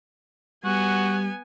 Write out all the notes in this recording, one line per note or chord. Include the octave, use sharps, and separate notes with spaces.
G3 B3 F#4 G#5